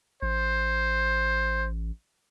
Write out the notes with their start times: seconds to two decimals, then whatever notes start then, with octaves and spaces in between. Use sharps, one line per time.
0.23 A1 C5